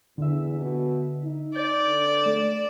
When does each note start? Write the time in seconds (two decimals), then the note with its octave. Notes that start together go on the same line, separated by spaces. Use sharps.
0.18 E2 D3 E5
0.60 B2
1.23 D#4
1.55 D5 G6 A6 D7
1.86 D3
2.23 A3 E7